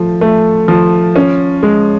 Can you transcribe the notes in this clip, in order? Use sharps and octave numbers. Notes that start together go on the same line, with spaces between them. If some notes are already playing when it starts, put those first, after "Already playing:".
Already playing: F3 A3
A3
F3
C#4
G#3